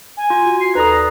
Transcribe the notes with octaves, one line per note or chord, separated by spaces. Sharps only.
G#5
F4
F#4
C7
D#2 A4 B4 D5 A#5 D#6